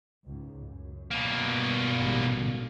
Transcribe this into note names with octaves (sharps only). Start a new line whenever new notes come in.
C#2 G#2
F#2
B2 A#3
G2
A1 G#2 G3
G#2 D3